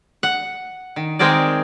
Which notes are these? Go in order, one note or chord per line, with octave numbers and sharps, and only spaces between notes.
F#5
D#3
D#3 G#3 C4 G#4 A#4 D5